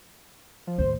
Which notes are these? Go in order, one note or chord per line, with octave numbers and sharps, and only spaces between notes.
F3
D#2 A2 C5